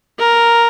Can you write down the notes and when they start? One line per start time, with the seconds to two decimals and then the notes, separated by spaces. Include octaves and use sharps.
0.19 A#4